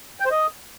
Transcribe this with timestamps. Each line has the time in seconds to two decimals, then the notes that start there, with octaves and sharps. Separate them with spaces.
0.20 G5
0.26 C5
0.31 D#5